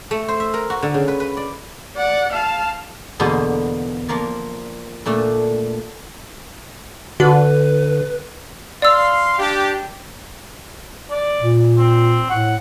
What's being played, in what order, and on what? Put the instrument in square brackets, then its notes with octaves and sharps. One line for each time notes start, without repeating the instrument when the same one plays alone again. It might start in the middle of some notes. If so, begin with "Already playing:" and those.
[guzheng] A3
C5
E5
A#4
F#4
D3
C#3
B4
B4
D5
[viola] D5 F#5
F5 A5
[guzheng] E2 B2 D3 A#3 C5
F3 A#3 A#4 D5
A#2 A3 D4
[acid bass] D3 [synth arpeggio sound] F#4 [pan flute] B4
[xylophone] D5 E6 [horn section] F5 C6
[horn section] D4 G4
[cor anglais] D5
[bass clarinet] A#2
[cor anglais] C4
[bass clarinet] A2 [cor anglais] F#5